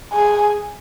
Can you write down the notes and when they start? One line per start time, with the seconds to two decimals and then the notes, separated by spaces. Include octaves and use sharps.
0.13 G#4